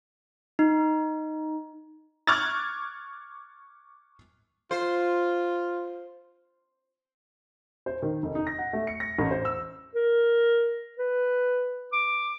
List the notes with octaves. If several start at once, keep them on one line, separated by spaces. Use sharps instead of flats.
D#4
C#6 D6 F6 F#6 G#6 A6
F4 C5
C5
D#3
F1
D#4
A#6
F#5
A3
C#7
A#6
A1
C5
E6
A#4
B4
D6